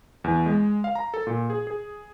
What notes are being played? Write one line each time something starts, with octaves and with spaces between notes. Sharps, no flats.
E2
G#3
F5
A#5
A4
A#2
G#4
G#4